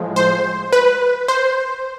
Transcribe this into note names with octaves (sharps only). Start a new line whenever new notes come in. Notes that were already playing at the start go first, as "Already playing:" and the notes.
Already playing: A2 F3 G#3
C5
B4
C5